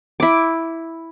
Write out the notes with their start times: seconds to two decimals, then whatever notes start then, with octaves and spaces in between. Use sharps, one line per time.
0.20 E4 D6